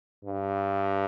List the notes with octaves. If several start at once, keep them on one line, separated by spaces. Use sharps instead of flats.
G2